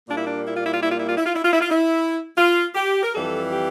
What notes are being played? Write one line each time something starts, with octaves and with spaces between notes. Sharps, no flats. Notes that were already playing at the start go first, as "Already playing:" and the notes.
A#2 G3 A#3 D4
E4
D4
E4
F4
E4
F4
E4
F4
E4
F4
E4
F4
E4
F4
E4
F4
E4
F4
G4
A#4
F2 E3 G3 A4
G4